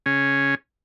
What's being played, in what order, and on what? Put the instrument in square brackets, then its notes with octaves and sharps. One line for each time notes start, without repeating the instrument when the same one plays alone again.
[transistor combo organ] C#3 C#4